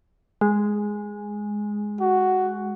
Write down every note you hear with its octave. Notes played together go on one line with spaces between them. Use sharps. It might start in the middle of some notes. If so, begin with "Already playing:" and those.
G#3
F#4